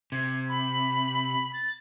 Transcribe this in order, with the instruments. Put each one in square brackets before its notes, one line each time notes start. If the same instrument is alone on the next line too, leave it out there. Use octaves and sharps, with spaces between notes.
[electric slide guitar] C3 [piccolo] G#6
[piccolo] B5
A6